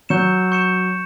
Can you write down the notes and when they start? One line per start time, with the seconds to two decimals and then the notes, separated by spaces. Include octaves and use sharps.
0.09 F#3 C#6 G6 C#7 E7
0.52 C#6 G6 C#7 E7